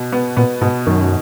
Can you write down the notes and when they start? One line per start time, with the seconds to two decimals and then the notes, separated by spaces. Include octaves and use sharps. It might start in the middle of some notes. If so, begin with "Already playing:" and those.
Already playing: B2
0.13 B3
0.37 A#2 B3
0.61 G#2 B2
0.86 F#2 D#3